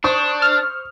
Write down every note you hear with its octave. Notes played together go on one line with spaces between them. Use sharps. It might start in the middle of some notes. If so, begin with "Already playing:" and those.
D4 C5 C#6 D#6
F6